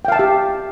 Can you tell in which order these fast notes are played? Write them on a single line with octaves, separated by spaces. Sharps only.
G5 F5 A5 E5 G4